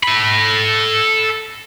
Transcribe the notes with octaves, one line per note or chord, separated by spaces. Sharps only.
A4 B5